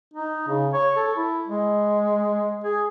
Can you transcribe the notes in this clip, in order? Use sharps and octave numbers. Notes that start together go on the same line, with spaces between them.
D#4
C#3
C#5
A4
E4
G#3
G#4